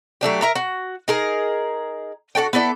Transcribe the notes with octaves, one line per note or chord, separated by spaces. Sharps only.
F#3 A3 D4 G4
A#4 E5 A#5
F#4
D#4 G#4 A#4
D4 F#4 A4 G5
B3 E4 A4 D5